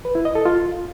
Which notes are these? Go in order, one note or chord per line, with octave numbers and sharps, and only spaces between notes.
B4
E4
D#5
A4
F4